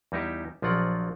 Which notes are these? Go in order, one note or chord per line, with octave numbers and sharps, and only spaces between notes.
E2 G3 D#4 E4 G4
A#1 F3 F#3 F4 D5 F#5